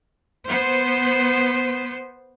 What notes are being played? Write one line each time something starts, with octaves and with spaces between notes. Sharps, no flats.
B3 C5